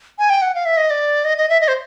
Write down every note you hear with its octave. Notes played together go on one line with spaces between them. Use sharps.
G#5
G5
F#5
F5
E5
D#5
D5
D#5
D#5
E5
D#5
C5